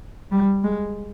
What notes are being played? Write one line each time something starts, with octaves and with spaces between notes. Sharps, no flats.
G3
G#3